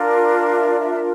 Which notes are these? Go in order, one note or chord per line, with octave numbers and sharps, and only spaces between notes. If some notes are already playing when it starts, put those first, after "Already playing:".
Already playing: D4 F4 A#4
F5
F5
E5
D5
E5
E5